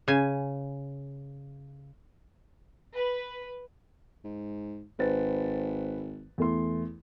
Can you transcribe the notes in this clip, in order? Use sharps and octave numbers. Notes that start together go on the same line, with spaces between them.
C#3 G#5
B4
G#2
G#1 B4 C5 A6
E2 A3 C6